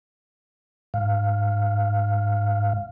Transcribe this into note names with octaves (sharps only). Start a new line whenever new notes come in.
G#2 F5